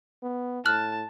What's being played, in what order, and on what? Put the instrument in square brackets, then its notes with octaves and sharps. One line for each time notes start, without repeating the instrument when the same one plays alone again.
[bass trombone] B3
[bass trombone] A2 [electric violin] A5 [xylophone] F6 F#6 F#7